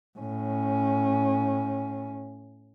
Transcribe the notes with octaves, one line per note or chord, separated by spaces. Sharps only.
A2 C#4